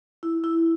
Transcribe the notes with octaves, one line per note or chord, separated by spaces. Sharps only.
E4
E4